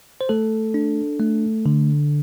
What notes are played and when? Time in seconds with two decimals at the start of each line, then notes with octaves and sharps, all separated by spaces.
0.21 C5
0.29 A3 A4
0.74 D4
1.20 A3
1.66 D3